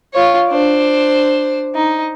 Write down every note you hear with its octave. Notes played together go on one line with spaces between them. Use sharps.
F4 C#5
D4 C5
D#4